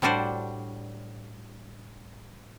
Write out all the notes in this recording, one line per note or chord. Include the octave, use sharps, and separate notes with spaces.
A2 G3 D4 F#4 C5